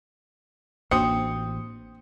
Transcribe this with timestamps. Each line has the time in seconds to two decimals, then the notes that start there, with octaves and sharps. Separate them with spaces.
0.91 A1 A#3 C4 D4 F#4 D#6 C#7